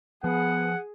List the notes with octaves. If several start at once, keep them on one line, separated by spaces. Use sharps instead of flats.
F3 B3 G#4 F#5